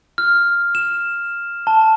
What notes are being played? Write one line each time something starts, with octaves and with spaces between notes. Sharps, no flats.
F6
E7
A5